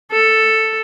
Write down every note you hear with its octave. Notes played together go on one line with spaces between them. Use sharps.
A4